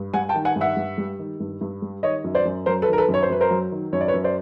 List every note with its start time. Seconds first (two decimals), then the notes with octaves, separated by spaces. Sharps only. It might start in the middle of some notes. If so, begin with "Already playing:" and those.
Already playing: G2
0.14 G3 F#5 G#5
0.29 G5 A5
0.35 D#3
0.45 F#5 G#5
0.56 G2
0.61 E5 F#5
0.77 G2
0.98 G3
1.19 D#3
1.40 G2
1.61 G2
1.82 G3
2.03 D#3 C#5 D#5
2.24 F#2
2.35 C5 D5
2.45 F#2
2.66 F#3 A#4 C5
2.82 A4 B4
2.88 D#3
2.93 A#4
2.98 A4 B4
3.08 F#2
3.14 C#5
3.23 C5
3.30 F#2 B4
3.41 A#4 C5
3.51 F#3
3.72 D#3
3.93 F#2 C#5
4.01 D5
4.08 B4 C#5
4.14 F#2
4.24 C5 D5